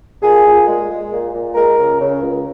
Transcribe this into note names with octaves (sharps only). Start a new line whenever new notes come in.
A#2 G#4
A#2
G#3
G#3
A#2
A#2
G#3 A#4
C#2
C#3
C#2